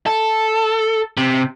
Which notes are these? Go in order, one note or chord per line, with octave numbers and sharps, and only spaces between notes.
A4
C3